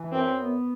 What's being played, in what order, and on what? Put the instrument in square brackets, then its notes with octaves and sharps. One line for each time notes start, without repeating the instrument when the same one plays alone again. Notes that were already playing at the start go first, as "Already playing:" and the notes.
Already playing: [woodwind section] E3
[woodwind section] F#2 [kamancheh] C4
[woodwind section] B3